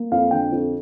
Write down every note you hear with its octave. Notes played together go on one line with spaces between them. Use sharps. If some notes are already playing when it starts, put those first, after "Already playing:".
Already playing: A#3
F2 F5
D3 G5
F2